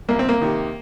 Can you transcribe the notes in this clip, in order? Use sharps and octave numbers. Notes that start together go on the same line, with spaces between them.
C2 A#3
C4
A#3
C3 D#3